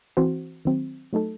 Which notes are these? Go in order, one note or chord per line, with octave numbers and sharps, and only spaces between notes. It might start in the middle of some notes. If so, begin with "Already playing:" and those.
E3 C4 F#4 C5
D#3 F#3 C4
F#3 A3 D#4 A4